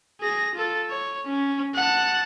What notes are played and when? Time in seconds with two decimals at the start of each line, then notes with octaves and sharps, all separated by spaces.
0.20 G#4 A#6
0.55 F4 A4
0.90 C#5
1.26 C#4
1.75 F#5 A5